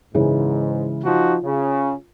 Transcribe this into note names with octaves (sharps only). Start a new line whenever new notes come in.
G#2 C#3 E3 G#3
F3 D#4 F4 F#4
C#3